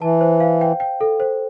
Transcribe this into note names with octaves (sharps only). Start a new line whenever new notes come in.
E3 A5
C5
F5
G5
G5
A4
C5